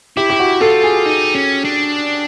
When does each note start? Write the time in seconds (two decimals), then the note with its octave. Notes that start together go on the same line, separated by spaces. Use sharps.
0.17 E4 G4
0.30 G4
0.39 F#4
0.61 F4 A4
0.83 G#4
1.06 D#4
1.35 C#4
1.65 D4